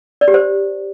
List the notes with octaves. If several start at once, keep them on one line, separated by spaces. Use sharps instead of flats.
D5
G4
C5